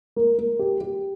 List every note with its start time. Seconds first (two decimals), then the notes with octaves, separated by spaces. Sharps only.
0.16 A#3
0.38 A#3
0.59 G4
0.81 G4